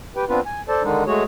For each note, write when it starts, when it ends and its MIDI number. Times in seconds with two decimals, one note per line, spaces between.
0.16 0.25 67
0.16 0.25 71
0.16 0.25 79
0.29 0.40 59
0.29 0.40 60
0.29 0.40 62
0.29 0.40 65
0.29 0.40 71
0.46 0.61 80
0.68 0.83 69
0.68 0.83 72
0.68 0.83 74
0.68 0.83 81
0.83 1.04 50
0.83 1.04 51
0.83 1.04 56
0.83 1.04 62
0.83 1.04 63
1.07 1.24 56
1.07 1.24 57
1.07 1.24 66
1.07 1.24 68
1.07 1.24 73